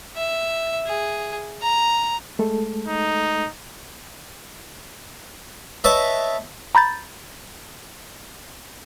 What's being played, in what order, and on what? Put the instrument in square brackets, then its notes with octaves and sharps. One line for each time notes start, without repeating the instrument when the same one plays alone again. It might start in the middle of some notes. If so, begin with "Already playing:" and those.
[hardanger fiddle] E5
G#4
A#5
[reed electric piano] G#3 A3 A4
[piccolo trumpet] D#4
[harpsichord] B4 C#5 D#5 E5 A5
[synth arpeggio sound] A#5 B5 G6 A6